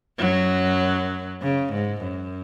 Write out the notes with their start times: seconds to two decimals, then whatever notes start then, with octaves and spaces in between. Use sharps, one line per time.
0.19 F#2 F#3
1.42 C#3
1.73 G#2
2.03 F#2